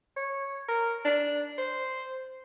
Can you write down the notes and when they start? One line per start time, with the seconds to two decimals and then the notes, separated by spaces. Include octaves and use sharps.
0.17 C#5
0.69 A#4
1.05 D4
1.58 C5